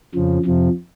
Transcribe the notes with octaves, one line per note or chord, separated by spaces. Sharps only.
F2 C#3 F3
F2 C3 F3